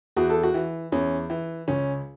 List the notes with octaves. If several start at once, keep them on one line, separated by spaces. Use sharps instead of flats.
E2 F#4
A4
F#4
E3
E2 C#4
E3
C#2 C#4